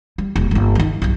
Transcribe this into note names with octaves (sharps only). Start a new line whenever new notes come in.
G3
D#1
G1 A#3
D#3 D#4
B1 G2